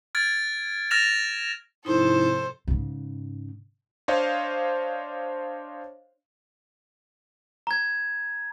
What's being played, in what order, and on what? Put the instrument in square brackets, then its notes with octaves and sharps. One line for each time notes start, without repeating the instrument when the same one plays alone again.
[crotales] F6 G#6 A6 D7
F6 A6 A#6 E7 F7
[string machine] G#2 C3 F3 [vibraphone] D#4 E4 [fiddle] A4 C5
[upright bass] G#2 C#3
[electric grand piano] D4 C5 C#5 D#5 F5
[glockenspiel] A#5 G#6